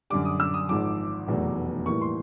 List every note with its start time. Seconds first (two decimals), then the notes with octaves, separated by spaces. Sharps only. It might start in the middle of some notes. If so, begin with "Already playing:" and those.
0.10 F#2 D3 G3 D6
0.25 D#6
0.40 E6
0.54 D#6
0.69 G#1 G#2 F3 D6
1.28 F1 E2 B2 F#3 A3
1.86 A2 E3 G3 A#3 C#6
2.01 C6